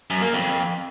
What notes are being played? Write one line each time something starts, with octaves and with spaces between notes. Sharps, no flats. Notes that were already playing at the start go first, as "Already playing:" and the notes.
F#2
A#3
F2